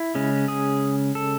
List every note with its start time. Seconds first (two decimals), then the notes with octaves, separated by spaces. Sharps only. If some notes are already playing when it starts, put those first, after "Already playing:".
Already playing: E4
0.15 C#3 G#3 C#4
0.48 G#4
1.15 A4